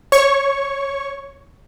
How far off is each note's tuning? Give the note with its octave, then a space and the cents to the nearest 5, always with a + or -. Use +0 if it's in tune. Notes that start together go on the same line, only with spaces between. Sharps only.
C#5 -10 C#6 +0